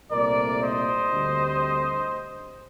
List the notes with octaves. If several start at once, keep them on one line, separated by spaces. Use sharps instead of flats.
C2 A#2 A3 C4 A#4 D5
C5 D#5
D2 D3 G3 C4